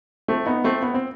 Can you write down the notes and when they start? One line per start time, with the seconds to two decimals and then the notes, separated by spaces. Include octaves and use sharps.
0.28 A3 C4
0.46 B3 D#4
0.64 A3 C4
0.82 B3
0.94 C4